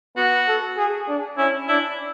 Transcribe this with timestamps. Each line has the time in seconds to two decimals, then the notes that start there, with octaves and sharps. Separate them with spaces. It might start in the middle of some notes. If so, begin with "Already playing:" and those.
0.16 B3 F#4
0.47 A4
0.77 G#4
1.08 D4
1.37 C#4 E4
1.68 D4 E4